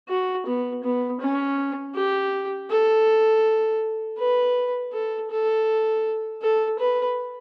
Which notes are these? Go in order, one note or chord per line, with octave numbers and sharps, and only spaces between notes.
F#4
B3
B3
C#4
G4
A4
B4
A4
A4
A4
B4